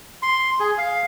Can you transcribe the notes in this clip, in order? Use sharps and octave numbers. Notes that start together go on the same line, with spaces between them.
C6
G#4
F5